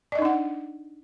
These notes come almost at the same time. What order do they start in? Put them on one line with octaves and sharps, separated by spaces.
D5 D#5 D#4 D4 F#5